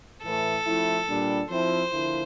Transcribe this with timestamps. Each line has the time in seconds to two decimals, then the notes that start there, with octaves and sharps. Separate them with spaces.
0.23 A2 E3 A3 A4
0.66 F3 A3 C4 E4
1.08 A#2 G3 D4
1.50 F3 C4 E4 C5
1.92 D3 F3 A#3 E4